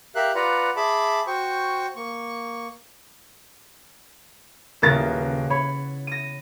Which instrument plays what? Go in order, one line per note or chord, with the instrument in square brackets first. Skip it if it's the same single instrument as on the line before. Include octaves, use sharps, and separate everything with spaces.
[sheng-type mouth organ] G4 A#4 E5 F5 F#6
F4 B4 D5 F#5 A#5
G#4 E5 A5 B5 D6
F#4 C5 G5 C#6
A#3 C#6
[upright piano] D#1 A#4 A6 [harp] C#3 B3 E4
[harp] C#5 [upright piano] B5
[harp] A#6 D#7